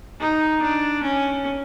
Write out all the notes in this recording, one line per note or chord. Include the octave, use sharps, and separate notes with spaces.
D#4
D4
C#4